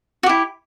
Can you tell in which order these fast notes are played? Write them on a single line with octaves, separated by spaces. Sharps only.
F#4 G4 E4